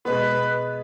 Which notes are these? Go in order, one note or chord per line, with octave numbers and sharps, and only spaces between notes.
B2 G#3 B3 B4